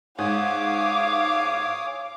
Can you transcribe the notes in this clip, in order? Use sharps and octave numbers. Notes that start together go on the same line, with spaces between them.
G#2 C#5 F5 G#5 D6 D#6